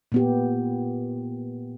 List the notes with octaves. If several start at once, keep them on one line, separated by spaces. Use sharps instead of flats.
A#2 B3 G4